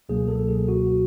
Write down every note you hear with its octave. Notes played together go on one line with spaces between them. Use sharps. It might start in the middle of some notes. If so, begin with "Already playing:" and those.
C#2 B2 F#3 A#3 G#4
A4
G#4
F#4